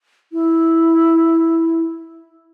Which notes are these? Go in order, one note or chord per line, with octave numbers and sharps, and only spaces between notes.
E4